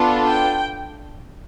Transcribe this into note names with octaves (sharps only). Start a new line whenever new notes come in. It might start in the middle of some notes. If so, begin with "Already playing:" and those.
Already playing: B3 D4 F4 A4
G5